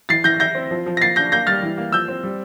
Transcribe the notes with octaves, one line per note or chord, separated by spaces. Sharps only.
E3 A6 C7
E3 G6 A#6
E4 G6 A#6
C4
F3
F3
A#6
A#3 A6 C7
D4 G6 A#6
A#3 G6 A#6
G3 F6 A6
E3
A#3
F3 E6 G6
C4
G3